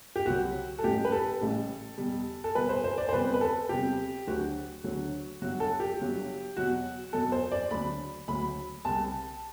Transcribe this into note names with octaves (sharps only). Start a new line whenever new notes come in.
G4
C2 C3 F#3 F#4
A4
A1 A2 G3 G4
B4
A4
A1 A2 G3
E2 B2 G3
A4
E2 B2 G3 B4
C5
C5
D5
C5
E2 C3 G3 B4
B4
A4
E2 C3 G3 G4
D2 D3 F#3 F#4
D2 D3 F#3
G1 G2 F#3 F#4
A4
G4
G1 G2 F#3
E2 B2 F#3 F#4
E2 B2 F#3 A4
C5
D5
D2 D3 F#3 B5
D2 D3 F#3 B5
C2 C3 G3 A5